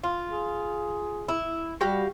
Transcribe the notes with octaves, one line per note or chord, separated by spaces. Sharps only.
F4
G#4
E4
G3 F#4 G4 F5